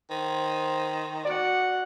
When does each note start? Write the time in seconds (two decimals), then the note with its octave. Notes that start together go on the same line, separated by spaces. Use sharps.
0.11 D#3 C5
1.25 F#4 D5 F#5